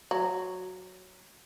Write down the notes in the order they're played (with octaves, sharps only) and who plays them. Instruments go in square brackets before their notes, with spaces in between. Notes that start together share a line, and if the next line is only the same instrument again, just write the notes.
[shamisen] F#3